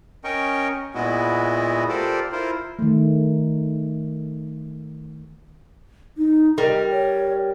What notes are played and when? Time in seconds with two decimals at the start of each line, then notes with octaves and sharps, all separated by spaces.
0.24 C#4 A#4 D#5 G5 C#6
0.95 A#2 G#3 B3 E4 F#4 D#5
1.89 F4 G4 A4 A#4 C5 D5
2.32 E4 F4 A#4 C5
2.79 D#3 A3
6.17 D#4
6.58 G3 A#4 D#5
6.91 C#5